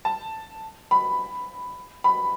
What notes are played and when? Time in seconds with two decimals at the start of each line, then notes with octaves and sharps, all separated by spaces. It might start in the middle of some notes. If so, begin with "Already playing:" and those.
0.05 A5
0.91 B5
2.04 B5